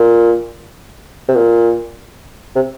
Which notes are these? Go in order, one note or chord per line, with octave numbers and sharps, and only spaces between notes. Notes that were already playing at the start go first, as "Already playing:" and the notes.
Already playing: A#2
C3
A#2
C3